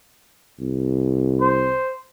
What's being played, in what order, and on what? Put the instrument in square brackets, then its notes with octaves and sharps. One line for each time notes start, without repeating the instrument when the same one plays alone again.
[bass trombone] C2
[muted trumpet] C5